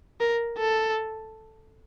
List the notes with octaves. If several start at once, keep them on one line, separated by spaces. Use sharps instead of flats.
A#4
A4